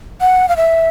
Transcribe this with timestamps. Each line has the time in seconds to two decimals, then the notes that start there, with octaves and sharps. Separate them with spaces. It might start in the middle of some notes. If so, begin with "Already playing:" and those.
0.21 F#5
0.49 F5
0.57 E5